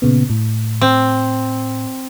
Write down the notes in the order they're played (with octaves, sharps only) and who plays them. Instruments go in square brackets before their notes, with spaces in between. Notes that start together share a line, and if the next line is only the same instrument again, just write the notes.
[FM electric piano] A#2 C#3 B3
A2
[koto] C4